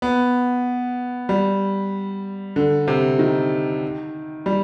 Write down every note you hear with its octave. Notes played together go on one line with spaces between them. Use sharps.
B3
G3
D3
C3
D#3
G3